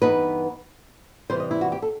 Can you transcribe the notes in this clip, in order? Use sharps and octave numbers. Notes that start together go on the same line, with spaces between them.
G2 E3 B3 D#4 B4
C3 E3 G3 C5
D#5
E4
F#4
G4
A4